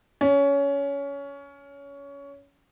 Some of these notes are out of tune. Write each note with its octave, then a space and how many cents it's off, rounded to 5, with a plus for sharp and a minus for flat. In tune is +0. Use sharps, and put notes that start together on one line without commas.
C#4 +20